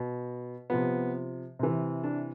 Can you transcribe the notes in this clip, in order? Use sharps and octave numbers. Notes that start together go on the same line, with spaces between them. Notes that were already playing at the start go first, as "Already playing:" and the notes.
Already playing: B2
C3 F3 B3
C3 E3
D4